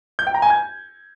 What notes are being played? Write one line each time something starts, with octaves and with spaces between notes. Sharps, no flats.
G6
G5
A#5
G#5
G#6